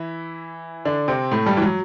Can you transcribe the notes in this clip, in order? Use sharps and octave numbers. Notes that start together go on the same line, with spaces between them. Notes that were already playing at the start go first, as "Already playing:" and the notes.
Already playing: E3 E4
D3 D4
C3 C4
A2 A3
G2 G3
E3
F#3